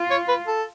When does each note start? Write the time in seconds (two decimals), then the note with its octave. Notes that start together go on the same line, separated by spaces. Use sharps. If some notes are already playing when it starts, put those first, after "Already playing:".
Already playing: F4
0.10 C#5
0.28 B4
0.47 A4